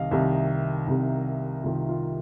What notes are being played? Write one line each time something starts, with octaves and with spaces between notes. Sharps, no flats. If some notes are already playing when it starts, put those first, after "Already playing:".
Already playing: C2 C3 D#3 D#5 F5
C2 C3 D#3
C2 C3 D#3
C2 C3 D#3 F4
F4